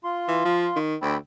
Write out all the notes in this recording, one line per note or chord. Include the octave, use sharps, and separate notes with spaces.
F4 C6
E3
F3
D#3
D2 G5 B5 E6